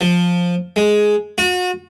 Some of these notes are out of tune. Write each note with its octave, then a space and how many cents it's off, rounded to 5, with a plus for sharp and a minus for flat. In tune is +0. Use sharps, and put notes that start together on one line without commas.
F3 +10
G#3 +10
F#4 -35